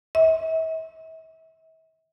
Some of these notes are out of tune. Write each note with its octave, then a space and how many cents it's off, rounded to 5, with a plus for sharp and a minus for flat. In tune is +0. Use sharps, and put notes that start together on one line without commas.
E5 -40